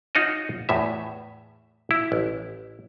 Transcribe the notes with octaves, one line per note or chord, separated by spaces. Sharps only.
D#4 F4 F#4 C#5 D#5
E2 A2 E5
E4
A1